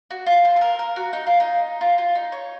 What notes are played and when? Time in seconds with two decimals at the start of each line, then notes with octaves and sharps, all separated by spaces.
0.10 F#4
0.26 F4
0.45 C5
0.56 A4
0.61 A#4
0.79 A#4
0.96 F#4
1.13 D#4
1.27 F4
1.40 D#4
1.81 F4
1.98 F4
2.15 D#4
2.32 C#5